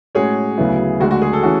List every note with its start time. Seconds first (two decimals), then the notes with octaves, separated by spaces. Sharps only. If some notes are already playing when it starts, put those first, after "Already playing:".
0.15 A2 G#3 C#4 F#4 G#4 C#5
0.58 D2 C#3 F#3 B3 E4
1.00 D2 D3 G#3 F#4
1.11 F#4
1.22 G#4
1.33 A4
1.43 E3 A3 C#4 F#4